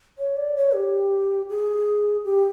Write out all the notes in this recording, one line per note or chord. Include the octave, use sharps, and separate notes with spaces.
C#5
D5
C#5
G4
G#4
G4